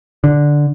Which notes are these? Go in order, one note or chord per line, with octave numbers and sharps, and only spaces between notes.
D3